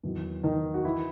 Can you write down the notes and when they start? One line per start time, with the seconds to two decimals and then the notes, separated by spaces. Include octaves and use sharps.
0.03 E2 D#3 F#3
0.43 D#3 D#4
0.74 F#4
0.84 E3 E4